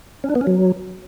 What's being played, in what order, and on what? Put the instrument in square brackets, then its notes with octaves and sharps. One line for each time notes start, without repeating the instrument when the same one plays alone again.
[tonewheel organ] C#4
D4
B3
C#4
F#3